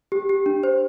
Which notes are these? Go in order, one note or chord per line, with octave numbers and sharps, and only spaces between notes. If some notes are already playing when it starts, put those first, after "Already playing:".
G4
G4
D4
C5